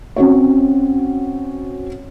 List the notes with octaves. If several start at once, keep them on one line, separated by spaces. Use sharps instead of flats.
C4 C#4 F#4 C#5